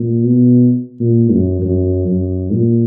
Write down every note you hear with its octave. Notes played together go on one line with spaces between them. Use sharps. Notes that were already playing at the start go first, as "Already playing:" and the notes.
Already playing: A#2
B2
A#2
F#2
F#2
F#2
A#2